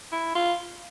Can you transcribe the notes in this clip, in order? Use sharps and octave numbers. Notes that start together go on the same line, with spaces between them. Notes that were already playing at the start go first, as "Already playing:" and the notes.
E4
F4